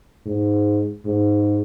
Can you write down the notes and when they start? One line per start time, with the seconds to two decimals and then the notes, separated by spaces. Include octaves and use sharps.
0.26 G#2
1.06 G#2